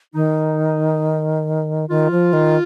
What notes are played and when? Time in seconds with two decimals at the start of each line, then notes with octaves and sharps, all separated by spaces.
0.14 D#3 D#4
1.90 D#3 F4
2.11 F3
2.33 D#3